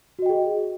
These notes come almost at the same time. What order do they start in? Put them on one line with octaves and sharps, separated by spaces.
F#4 D#5 G5 G#4